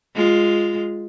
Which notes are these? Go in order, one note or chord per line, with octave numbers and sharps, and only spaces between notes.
G#3 F4